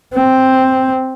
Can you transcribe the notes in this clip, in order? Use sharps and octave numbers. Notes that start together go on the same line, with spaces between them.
C4